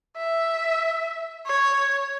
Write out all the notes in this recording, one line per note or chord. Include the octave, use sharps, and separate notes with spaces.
E5
C#5